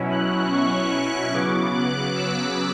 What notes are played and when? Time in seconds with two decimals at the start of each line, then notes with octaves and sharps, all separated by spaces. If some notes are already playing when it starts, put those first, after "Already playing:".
Already playing: B2 F#3 C#4 E4
0.11 F#6
0.52 C#6
1.33 C#3 F#3 B3 D6
1.75 F#6
2.15 E6